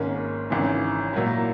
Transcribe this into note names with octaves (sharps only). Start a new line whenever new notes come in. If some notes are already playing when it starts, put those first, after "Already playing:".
Already playing: G#1 G#2 D#3 A#3 C#4
G#1 F#2 C#3 E3
A#2 F#3 A#3 E4